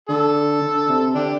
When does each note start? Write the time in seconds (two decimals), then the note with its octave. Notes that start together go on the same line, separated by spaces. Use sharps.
0.09 D3 A4
0.62 D3
0.89 C3
1.15 D3 D4 G4